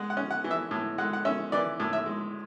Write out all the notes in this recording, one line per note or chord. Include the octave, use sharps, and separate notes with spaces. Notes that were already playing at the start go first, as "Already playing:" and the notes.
Already playing: G#3 F#5
F#5
C#4
F#5
E3
E5
A2
G#3 F#5
F#5
C#4 E5
E3 D5
A2
E5
G#3